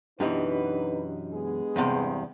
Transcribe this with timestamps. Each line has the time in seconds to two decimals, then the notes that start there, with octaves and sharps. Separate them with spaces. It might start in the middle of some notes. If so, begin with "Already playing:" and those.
0.20 F#2 B2 E3 D4 D#4 G4 B4 D#5
1.34 G#3 B3 G#4
1.76 E2 G2 C3